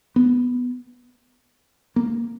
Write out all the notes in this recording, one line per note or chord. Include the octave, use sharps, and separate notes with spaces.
B3
A#3